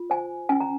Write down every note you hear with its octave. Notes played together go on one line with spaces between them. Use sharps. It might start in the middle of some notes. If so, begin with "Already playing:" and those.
Already playing: F4
C5 G#5
C#4 G#5
A#5